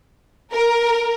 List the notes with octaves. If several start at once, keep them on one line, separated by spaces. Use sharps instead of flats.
A#4